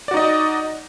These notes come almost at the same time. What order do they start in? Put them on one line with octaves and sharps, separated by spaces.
D5 F#4 D#4 D#5